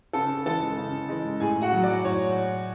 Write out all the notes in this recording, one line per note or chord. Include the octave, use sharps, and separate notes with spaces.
C#3 A4 A5
E3 G#3 A4 A5
C#3
E3 G#3
A2 G#4 G#5
F#4 F#5
F#3
D5
A2 C#5